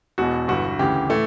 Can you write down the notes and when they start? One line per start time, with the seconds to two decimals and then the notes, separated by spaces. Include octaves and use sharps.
0.18 E1 E2 B2 F#4
0.48 G1 G2 E3 F#4
0.79 D2 C#3 E3 G4
1.09 A2 E3 A3